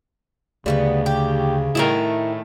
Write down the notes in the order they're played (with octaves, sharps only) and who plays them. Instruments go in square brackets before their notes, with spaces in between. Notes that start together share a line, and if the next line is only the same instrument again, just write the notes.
[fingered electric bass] D2 [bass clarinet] C#3 [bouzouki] G3 A3 B3
[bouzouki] G4
[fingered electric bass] A2 [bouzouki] D#3 A3 G#4 [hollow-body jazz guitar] E4 A#4